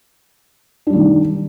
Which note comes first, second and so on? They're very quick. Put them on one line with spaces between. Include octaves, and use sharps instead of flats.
D4 G3 D#4 D#3